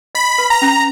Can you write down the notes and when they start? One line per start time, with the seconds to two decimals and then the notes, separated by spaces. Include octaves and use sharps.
0.15 D#5 B5
0.38 B4
0.50 A#5
0.62 C#4